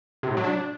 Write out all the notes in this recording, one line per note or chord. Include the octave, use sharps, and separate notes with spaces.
C3
A2
F#3
D4